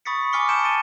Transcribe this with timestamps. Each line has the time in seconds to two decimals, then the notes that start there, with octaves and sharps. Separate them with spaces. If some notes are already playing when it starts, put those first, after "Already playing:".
0.05 B5 C#6 D#6 A6 B6 C#7
0.33 G#5 D6 F6 B6 C#7 G7
0.49 A5 G6 C#7 D7 E7
0.64 A6 D7 D#7 G7